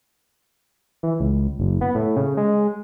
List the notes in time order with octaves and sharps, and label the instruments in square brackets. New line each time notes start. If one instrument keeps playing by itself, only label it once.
[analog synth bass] E3
C#2
F#1
B3
A2
C#3
G#3